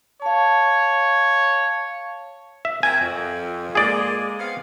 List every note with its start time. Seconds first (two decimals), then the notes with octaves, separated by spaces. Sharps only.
0.22 C#5 F5 A5
2.65 E5
2.83 C4 F#4 A#4 G#5
3.00 F2
3.75 G#3 A#3 G#4 D5
4.39 B3 C4 F5